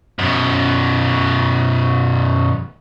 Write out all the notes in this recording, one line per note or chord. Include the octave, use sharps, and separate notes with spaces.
F#2 B2